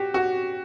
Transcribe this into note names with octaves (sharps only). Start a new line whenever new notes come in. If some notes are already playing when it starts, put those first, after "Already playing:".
Already playing: F#4 G4
F#4